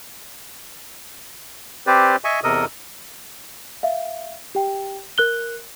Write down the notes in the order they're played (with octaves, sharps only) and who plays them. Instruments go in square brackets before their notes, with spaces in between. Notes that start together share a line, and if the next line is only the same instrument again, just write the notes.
[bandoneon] C4 G4 B4 C5 D5
D#5 E5 G#5 C#6
E2 C3 A4 A#4 D#5 D#6
[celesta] E5 F5
G4 G5
A#4 F#6 G7